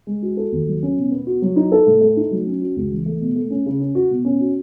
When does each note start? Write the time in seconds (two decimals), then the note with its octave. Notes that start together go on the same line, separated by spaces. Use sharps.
0.07 G#3
0.22 F#4
0.37 A4
0.52 D#2
0.67 F#3
0.83 C#4
0.98 B2
1.11 B3
1.27 F#4
1.42 F#3
1.56 D#4
1.72 A4
1.87 A2
2.01 A3
2.17 D#4
2.31 F#3
2.47 C#4
2.62 F#4
2.76 C#2
2.91 E3
3.06 A3
3.20 B2
3.36 A3
3.50 C#4
3.66 C#3
3.80 C#4
3.95 F#4
4.11 B2
4.25 C#4
4.40 F#4